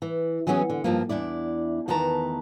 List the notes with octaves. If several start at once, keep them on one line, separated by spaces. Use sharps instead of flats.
E3
E3 F#3 B3 C#4 G4 G#4
D3
G2 F3 A#3
E2 D4 E4 D5
E2 D#3 A3 B4 A5 A#5